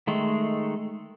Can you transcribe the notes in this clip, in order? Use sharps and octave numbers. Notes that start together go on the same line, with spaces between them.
D#3 G#3 A3